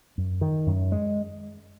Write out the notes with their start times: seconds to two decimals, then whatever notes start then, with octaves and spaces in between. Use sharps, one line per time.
0.18 F#2
0.41 D#3
0.66 F#2
0.92 G#3